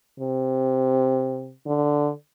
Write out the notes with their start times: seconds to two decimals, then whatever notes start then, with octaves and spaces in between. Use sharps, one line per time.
0.20 C3
1.67 D3